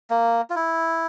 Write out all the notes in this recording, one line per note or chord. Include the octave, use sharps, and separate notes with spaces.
A#3
F4
E4